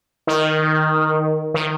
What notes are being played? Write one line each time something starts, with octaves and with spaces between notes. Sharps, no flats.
D#3
D#3